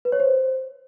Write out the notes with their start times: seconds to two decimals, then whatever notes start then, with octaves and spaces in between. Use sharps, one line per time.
0.05 B4
0.12 C#5
0.20 C5